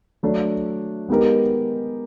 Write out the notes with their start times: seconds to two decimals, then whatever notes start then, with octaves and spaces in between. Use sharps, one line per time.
0.23 F#3 A3 D4
1.09 G#3 B3 D#4 G4 A#4